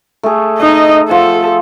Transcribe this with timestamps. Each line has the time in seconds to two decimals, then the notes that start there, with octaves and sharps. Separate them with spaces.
0.23 A3 G#4
0.58 D#4 D#5
1.09 F3 A4 F#5